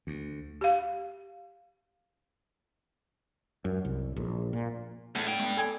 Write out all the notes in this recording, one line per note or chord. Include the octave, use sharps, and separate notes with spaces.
D2
G4 F5
F#2
C2
A#1
A#2
E2 A2
D4 G5
A3 B3
A4 D5 G#5